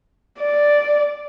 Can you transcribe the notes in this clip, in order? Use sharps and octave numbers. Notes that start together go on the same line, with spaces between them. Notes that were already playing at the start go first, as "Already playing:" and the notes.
D5